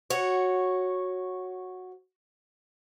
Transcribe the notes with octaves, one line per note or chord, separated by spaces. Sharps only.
F#4 C#5